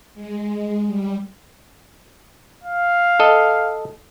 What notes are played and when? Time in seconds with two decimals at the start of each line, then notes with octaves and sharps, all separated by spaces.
0.14 G#3
0.86 G3
2.63 F5
3.20 A4 D#5